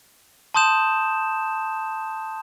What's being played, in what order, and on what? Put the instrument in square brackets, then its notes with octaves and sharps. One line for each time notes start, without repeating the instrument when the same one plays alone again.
[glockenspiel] A5 C6 D#6 G6 E7